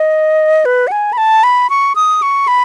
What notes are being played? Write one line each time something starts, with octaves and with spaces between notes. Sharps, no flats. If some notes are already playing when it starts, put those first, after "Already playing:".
Already playing: D#5
B4
F#5
G#5
B5
A5
B5
C#6
D#6
C#6
B5